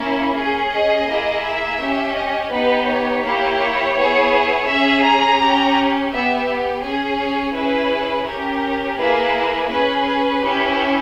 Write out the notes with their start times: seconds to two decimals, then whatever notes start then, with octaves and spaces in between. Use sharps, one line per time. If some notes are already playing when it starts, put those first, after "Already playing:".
Already playing: A#3 C#4 E4
0.36 C#4 G#4
0.72 D#5
1.08 A#3 E4 G#4
1.44 E5
1.79 C#4 G4
2.16 D#5
2.51 B3 D#4 G4 B4
2.87 C#5
3.23 A#3 E4 G4
3.59 C#5
3.95 B3 E4 G#4
4.67 C#4 G#4 E5
5.03 A#5
5.39 C#4 G4
6.11 B3 G4 E5
6.82 C#4 G#4
7.19 C#5
7.54 C#4 E4 G#4 B4
8.26 C#4 G4 A#4
8.98 A#3 E4 G#4 B4
9.69 C#4 G#4 B4
10.06 B4
10.42 C#4 E4 G4